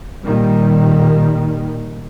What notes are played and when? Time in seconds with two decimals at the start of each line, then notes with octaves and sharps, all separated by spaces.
0.23 A#2 D#3 G3